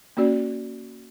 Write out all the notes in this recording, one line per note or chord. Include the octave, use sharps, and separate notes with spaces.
A#3 C#4 F#4 D5